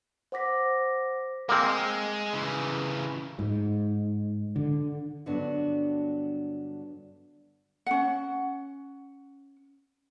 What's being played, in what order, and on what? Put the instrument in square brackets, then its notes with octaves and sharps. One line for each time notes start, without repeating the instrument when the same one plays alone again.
[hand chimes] C5 F#5 D6 A#6 B6
[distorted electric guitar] G#3 [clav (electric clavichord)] A#3 C4
[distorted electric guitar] C#3 E3
[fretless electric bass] G#2
D3
[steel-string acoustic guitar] G2 D3 F#3 B3 D4 F#4
[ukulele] C#4 F#5